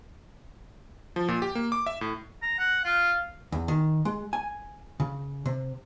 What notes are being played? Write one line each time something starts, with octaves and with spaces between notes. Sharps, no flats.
F3
A#2
G4
A#3
D6
E5
A2
A#5
F#5
F4 F5
E2
D#3
G#3
G#5
C#3
C3